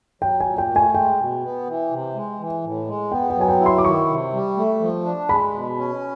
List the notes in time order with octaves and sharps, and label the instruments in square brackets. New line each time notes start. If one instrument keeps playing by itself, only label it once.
[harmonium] F#3 [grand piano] G5
[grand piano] G#5
[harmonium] A#2
[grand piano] G5
[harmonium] A3
[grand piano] G#5
[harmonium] G#3 [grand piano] G5
[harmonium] B2
B3
E3
C3
G#3
E3
A2
G#3
[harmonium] B3 [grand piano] G5
[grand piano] G5
[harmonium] F#3
[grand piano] G#5
G5
[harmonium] E4
[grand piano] C6
D6
[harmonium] D#3 [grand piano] C#6
[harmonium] C3
G3
A3
F3
D4
[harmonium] G#3 [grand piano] B5
[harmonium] B2
C#4